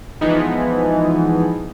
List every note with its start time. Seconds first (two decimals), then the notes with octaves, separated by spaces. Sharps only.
0.21 E3 F3 G#3 B3 D#4